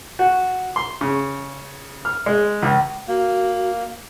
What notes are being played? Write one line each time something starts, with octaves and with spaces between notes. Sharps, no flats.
F#4
C6
C#3
F6
G#3
C#2
A#3 F#4